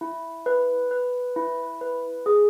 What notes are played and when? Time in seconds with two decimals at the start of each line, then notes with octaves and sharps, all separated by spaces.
0.01 E4
0.46 B4
0.91 B4
1.36 E4
1.81 B4
2.26 G#4